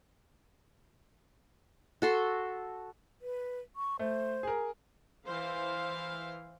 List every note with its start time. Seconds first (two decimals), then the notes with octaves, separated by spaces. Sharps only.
2.02 F#4 A4 C6
3.22 B4
3.76 C#6
3.99 A3 C5
4.43 G#4 A#4
5.25 E3 C5 F5